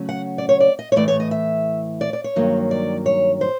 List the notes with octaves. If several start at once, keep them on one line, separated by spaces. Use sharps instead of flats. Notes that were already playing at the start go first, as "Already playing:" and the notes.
Already playing: C#3 F#3 A3 C#4
F#5
D5
C#5
D5
D#5
C#5
A2 E3 A3 D5
C#5
D#5
E5
D5
D5
C#5
G2 D#3 F#3 A#3
D5
C#5
C5